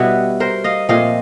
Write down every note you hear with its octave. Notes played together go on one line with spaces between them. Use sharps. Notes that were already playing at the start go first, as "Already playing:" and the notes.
Already playing: B2 G3 B3 E4 F#4
A#4 C5
D#5 F5
A#2 F3 A3 C4 D#5 F5